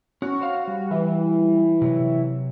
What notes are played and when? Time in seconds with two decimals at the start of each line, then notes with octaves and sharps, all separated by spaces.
0.22 C#4 F#4
0.41 C5 C#5 F5
0.68 G3
0.91 E3
1.82 C3 F#3